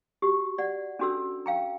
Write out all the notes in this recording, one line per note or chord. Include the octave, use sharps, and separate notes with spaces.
F#4 G4
D5 F#5
C#4 D4 F#4 A4 E6
F5 G5 A#5